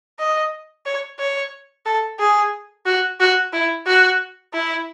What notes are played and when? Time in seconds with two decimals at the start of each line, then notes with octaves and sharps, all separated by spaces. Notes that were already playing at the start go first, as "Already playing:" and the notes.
0.19 D#5
0.86 C#5
1.19 C#5
1.86 A4
2.19 G#4
2.86 F#4
3.20 F#4
3.53 E4
3.87 F#4
4.53 E4